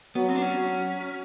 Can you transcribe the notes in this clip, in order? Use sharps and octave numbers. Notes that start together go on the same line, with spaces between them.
F#3 B3
C4
D4
C#4
F#3